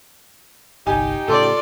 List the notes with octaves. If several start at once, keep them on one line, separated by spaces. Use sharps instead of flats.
G1 C2 D#4 G4 G#5
A2 C#3 F4 A4 D5